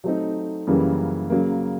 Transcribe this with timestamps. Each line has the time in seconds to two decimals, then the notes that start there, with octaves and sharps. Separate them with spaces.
0.04 F#3 A3 C4 D#4
0.67 F#2 C#3 E3 G3 A#3
1.30 C#3 F#3 A#3